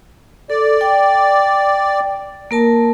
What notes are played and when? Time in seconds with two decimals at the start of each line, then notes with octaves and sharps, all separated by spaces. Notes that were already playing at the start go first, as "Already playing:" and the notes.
0.50 A4 D5
0.81 G5
2.51 A#3 A#4 A5